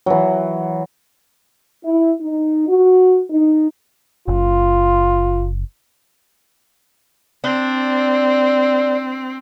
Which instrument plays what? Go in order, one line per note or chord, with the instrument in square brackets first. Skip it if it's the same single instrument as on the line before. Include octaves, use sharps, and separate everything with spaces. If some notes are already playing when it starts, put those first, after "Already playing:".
[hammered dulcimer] E3 F#3
[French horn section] E4
D#4
F#4
D#4
[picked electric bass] F#1 [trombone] F4
[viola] C4 [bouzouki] D4